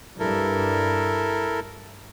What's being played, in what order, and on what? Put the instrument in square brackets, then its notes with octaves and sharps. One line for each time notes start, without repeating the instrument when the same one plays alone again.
[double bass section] G2 [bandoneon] E4 A4 A#4